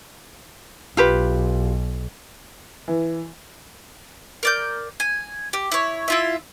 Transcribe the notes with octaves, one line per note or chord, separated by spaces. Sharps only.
B1 F4 G4 B4
E3
A#4 D5 G6
G#5
G4
E4 C#5
E4 F4 E5